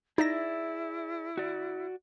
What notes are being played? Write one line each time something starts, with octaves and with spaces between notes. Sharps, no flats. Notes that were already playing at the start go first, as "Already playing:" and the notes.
D#4 E4 G#4 D5 E5 A#6
F#4 D5